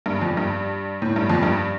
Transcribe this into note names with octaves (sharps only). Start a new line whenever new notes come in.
G2
F2
G2
A2
G2
F2
G2